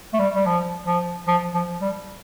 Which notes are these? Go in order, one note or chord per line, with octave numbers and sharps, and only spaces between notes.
A3
G3
G3
F3
F3
F3
F3
G3